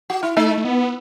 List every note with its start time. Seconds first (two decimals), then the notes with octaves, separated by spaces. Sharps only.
0.10 F#4
0.23 E4
0.37 A3 D#4
0.57 A3
0.64 B3